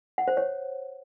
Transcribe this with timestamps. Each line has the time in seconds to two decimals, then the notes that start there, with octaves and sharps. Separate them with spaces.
0.18 F#5
0.28 C5
0.37 C#5